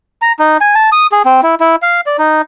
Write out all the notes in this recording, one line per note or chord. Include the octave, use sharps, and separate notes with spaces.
A#5
D#4
G#5
A5
D#6
G#4
C4
E4
E4
F5
D5
D#4